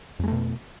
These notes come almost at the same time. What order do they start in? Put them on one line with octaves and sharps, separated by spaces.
F2 G#3 A3 B2